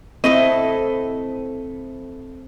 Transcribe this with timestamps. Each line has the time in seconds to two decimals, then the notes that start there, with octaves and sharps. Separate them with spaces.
0.24 A3 C4 E4 A4 D#5